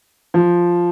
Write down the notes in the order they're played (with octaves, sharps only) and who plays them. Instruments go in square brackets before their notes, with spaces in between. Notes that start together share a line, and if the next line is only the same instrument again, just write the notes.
[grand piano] F3